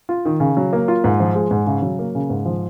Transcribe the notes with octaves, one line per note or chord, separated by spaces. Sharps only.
F4
D#3
C#3
F#3
A#3
F4
G#2
F3
G#3
G#2
C#3
F#3
A#3
C#3
G#2
F3